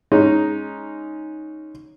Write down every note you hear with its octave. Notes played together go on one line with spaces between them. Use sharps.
G#3 C#4 D#4